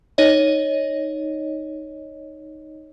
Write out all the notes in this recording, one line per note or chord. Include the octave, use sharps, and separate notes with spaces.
D#4 C#5 D#5